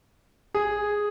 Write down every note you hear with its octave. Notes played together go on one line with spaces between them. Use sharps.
G#4